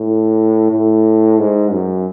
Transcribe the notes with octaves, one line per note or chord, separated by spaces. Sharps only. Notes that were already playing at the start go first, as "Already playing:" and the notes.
Already playing: A2
A2
G#2
F#2